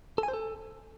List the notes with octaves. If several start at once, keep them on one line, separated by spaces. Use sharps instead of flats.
A4
G#5
C5
A4